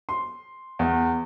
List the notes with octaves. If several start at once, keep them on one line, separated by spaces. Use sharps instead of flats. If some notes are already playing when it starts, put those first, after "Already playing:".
C6
E2